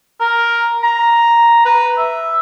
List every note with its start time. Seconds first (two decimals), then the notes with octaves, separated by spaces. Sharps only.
0.20 A#4
0.83 A#5
1.66 B4
1.98 E5